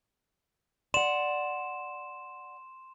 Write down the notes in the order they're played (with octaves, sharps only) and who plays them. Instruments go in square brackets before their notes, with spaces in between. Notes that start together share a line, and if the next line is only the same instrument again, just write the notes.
[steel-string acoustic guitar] D5 F#5 [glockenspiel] C6 E7